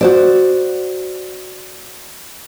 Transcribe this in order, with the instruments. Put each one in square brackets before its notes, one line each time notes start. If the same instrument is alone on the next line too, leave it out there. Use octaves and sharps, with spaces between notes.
[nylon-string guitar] F#4 C5 D5